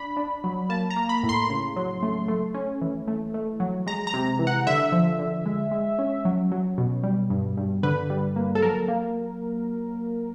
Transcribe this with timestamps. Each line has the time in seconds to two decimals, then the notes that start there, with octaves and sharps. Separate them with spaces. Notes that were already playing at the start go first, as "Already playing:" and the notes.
Already playing: D4 B5
0.17 D4
0.44 F#3
0.69 A#3 A5
0.90 A#5
0.96 A#3
1.09 B5
1.23 A2
1.29 C6
1.50 C#3
1.76 F#3
2.03 A3
2.28 A3
2.54 C#4
2.82 E3
3.08 A3
3.34 A3
3.60 F#3
3.87 G#3 A#5
4.07 A#5
4.14 C3
4.39 E3
4.47 F#5
4.67 D3 E5
4.92 F3
5.19 D3
5.46 G#3
5.71 G#3
5.99 C#4
6.25 F#3
6.52 F#3
6.78 B2
7.03 G3
7.30 G2
7.57 G2
7.83 D3 B4
8.10 G3
8.36 A#3
8.55 A4
8.62 F#3 A#4
8.88 A#3